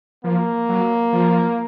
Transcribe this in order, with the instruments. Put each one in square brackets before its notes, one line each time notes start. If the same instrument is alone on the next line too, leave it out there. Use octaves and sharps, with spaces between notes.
[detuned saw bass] F3 [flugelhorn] A#3
[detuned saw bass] F#3
F3